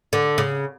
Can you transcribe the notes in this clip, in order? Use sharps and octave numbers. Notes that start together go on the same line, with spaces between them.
D3
C#3